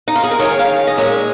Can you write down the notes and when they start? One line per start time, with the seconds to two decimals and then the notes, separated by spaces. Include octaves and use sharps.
0.08 D#4
0.16 F4
0.24 G#4
0.31 A#4
0.39 D#3 G#3 C#4 C#5
0.52 G#5
0.59 F5
0.87 D#5
0.97 A#2 G#3 C#4 C#5